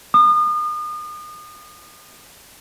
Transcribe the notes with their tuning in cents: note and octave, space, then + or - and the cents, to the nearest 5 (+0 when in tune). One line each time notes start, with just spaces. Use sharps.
D#6 -35